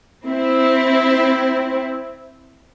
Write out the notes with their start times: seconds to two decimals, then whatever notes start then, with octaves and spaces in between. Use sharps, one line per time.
0.27 C4 E4